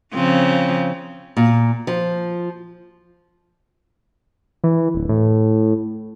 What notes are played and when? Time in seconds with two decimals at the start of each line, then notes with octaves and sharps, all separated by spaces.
0.14 C#3 F3 C4
1.37 A#2
1.87 F3
4.64 E3
4.95 D1
5.09 A2